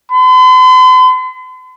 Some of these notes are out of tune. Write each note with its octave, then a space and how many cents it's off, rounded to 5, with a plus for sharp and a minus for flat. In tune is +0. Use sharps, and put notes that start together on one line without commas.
C6 -45